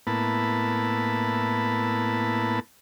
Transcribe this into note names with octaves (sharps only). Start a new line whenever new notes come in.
A2 A#3 B3 E4 A5 B5